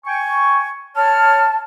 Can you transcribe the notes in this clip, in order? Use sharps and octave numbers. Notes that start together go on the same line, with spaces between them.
G5 G#5 C#6
C#5 A5 F6